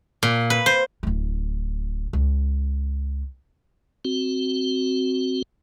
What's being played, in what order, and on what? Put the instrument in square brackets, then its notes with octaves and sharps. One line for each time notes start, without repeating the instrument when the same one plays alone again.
[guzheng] A#2
B4
C5
[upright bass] D1 E4
C#2
[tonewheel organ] C4 F#4